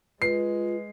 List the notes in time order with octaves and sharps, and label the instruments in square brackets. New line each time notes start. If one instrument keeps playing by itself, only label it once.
[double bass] G#3 [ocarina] F4 [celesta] B4 [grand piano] C7